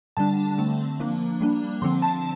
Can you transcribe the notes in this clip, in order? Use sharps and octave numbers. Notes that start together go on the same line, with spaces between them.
D3 G3 D4 A5
D3 A3 C4
F3 A#3 D4
G3 A#3 D4
D3 F3 C4 C6
A5